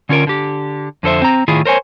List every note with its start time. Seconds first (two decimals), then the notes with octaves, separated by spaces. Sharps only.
0.09 D3 C#4 F4 G#4 A#4
0.27 D3 G4
1.03 F2 D3 A4 C5 E5
1.22 C4 A#5
1.48 A2 D#3 E4 F4 G#4
1.65 A#4 C5 C#5 G#5